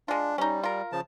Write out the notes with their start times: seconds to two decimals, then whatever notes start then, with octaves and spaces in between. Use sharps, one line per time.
0.08 G#3 D4 F4
0.38 G3 C#4 D#4
0.63 F4 A#4
0.92 C#3 F3 A5